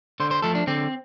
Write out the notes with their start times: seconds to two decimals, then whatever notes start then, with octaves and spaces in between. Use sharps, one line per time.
0.20 D3 C5
0.31 C5
0.42 F3 A3 A4
0.55 D4
0.67 D3 C4